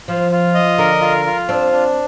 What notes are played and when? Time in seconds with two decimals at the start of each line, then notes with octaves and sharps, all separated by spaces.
0.08 F3 F4
0.32 F4
0.54 D#5
0.78 D3 A#4
1.01 F4
1.26 F4
1.49 C4 D4
1.72 D4